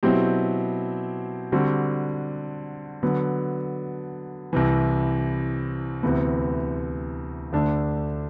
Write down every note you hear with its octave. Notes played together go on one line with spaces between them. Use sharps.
B2 F#3 C4 E4 G4
D3 G3 C4 F#4
D3 F#3 B3
C2 C3 E3
D2 C3 E3 B3
D2 D3 A3 D4